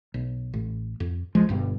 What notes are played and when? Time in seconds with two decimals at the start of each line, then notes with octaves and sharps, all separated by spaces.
0.14 B1
0.54 A1
1.00 F2
1.35 C#2 F3 G#3
1.49 G1 G2 B2